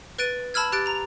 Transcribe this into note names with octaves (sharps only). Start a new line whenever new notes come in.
B4 F#6 A6 D7 D#7
A5 B5 E6 F6 G#6
G4 F#6 A6 D7
A#5 F7